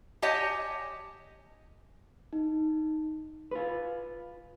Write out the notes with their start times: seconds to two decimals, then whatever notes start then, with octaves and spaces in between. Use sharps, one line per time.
0.22 G4 C#5 D#5 F#5 G#5 A5
2.33 D#4
3.51 F4 B4